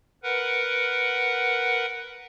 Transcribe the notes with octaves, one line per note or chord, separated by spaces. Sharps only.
A#4 B4 F#5